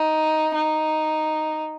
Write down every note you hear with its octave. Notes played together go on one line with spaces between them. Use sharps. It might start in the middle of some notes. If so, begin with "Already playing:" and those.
Already playing: D#4
D#4